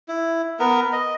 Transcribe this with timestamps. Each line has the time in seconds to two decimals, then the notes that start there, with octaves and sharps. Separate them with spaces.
0.08 E4
0.59 B3 A#4
0.93 D#5